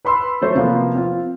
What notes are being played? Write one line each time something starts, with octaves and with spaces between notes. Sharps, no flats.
B4 B5 C6 E6
F#3 A3 C5
C3 F3 A#3 B3
C4 F4